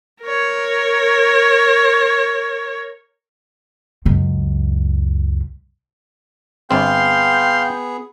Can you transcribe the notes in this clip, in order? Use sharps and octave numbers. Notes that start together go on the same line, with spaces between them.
A#4 C#5
C#2 F#2
G1 B3 C4 G#4 F5 G5 C6